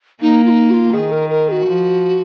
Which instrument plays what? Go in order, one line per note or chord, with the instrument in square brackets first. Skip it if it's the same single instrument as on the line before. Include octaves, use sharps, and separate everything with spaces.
[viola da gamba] A#3 [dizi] D#4
[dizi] F4
D#4
F#4
F4
[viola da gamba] D#3 [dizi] G#4
[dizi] A#4
A#4
G#4
F#4
[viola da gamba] F3